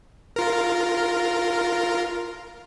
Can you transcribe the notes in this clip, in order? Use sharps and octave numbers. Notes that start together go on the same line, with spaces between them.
F4 A#4